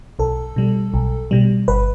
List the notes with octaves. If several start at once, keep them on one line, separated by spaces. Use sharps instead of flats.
B1 A4
B2 G3
B1
B2 G3
G1 B4